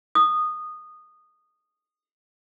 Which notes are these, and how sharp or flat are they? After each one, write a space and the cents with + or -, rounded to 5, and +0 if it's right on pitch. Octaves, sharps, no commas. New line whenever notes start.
D#6 -15